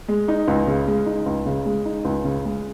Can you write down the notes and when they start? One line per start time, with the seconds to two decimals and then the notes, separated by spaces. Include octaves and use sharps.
0.08 G#3
0.28 D#4
0.48 C#2
0.67 C#3
0.87 G#3
1.06 D#4
1.26 C#2
1.46 C#3
1.66 G#3
1.85 D#4
2.05 C#2
2.25 C#3
2.45 G#3